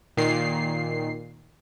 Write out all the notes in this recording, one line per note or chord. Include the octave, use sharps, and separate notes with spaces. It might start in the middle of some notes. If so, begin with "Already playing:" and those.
A#2 D#3 C7